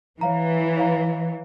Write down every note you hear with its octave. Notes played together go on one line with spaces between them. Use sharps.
E3 C#5 F5 A#5
C#5 F5 A#5